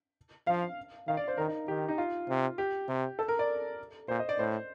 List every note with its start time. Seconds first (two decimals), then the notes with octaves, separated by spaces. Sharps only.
0.47 F3 F5
1.07 D#3 F5
1.17 D5
1.28 C5
1.37 D#3 A#4
1.48 D#4
1.68 D#3 G4
1.88 D#4
1.98 F4
2.29 C3
2.58 G4
2.88 C3
3.19 A4
3.28 A#4
3.39 D5
4.08 A#2 C5
4.19 D#5
4.29 D5
4.38 A2 C5